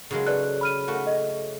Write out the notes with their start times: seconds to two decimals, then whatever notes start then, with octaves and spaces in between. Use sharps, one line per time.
0.11 C#3 F#3 G#3
0.26 A4 B4 D5 F#6
0.61 B5 F6 D#7
0.88 A3 F#4
1.07 D#5